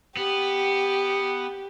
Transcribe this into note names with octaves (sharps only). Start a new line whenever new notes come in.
B3 G4